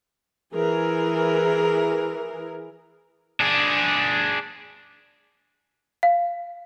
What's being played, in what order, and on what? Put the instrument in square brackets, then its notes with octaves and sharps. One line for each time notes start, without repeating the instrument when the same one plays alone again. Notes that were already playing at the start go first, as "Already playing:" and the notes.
[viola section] E3 G#4 A#4
[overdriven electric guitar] D4 G#4
[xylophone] F5